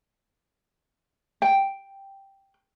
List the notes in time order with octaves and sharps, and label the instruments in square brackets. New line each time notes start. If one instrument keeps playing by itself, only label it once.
[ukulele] G5